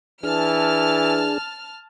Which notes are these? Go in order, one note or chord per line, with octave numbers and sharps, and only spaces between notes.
E3 D4 G#4 A5 F6